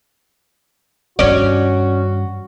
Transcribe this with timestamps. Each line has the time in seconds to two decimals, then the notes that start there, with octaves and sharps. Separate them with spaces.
1.19 G2 D#3 C#4 F#4 D5